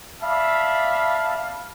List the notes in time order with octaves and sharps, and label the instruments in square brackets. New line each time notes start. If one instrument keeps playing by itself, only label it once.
[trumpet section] D5 E5 F5 A5 B5